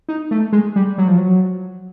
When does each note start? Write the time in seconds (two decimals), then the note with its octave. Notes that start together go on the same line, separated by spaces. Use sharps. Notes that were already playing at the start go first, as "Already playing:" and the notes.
0.08 D#4
0.31 A3
0.52 G#3
0.76 G3
0.98 F#3
1.08 F3
1.17 F#3